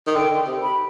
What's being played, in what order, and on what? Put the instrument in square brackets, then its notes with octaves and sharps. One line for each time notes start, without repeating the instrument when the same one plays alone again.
[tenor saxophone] D#3
[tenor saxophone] D3 [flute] G5
[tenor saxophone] C3
[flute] B5